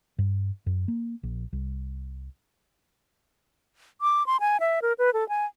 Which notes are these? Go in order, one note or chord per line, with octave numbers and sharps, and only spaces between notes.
G2
F#2
A#3
A#1
C2
D6
C6
G#5
E5
A#4
B4
A4
G#5